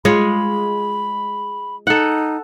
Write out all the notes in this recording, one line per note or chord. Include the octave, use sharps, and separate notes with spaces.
G#3 F4 C#5 B5
D#4 A4 F#5